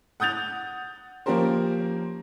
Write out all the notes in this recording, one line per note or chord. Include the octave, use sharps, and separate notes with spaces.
F#5 D#6 G6 A6 F7
F3 A#3 C#4 G4 A#4 C5